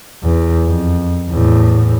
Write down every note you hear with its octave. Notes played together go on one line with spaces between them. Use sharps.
E2
F2
E2 A2